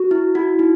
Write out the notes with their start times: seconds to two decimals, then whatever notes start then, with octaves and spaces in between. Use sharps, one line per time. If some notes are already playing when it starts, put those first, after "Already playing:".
Already playing: F#4
0.11 E4
0.35 E4 F#4
0.59 D#4